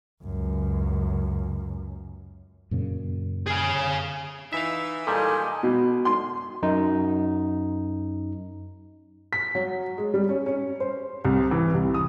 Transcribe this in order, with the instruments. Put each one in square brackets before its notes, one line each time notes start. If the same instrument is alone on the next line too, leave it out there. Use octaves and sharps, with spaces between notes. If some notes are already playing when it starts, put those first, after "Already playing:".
[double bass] C#2 F#2
[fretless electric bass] F#2 A#2 C#3
[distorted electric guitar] G#4 F5
[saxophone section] E3 D#4 [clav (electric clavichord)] E5 F5 [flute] E6
[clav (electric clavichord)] A#2 G3 [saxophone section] D#3 G#3 D#5 [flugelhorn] A4 [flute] G#5
[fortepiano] B2
C6
[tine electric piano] F#2 D#4
[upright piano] B6
F#3
G#3
G3
C#4
C#4
C5
C2
E3
C2
D#6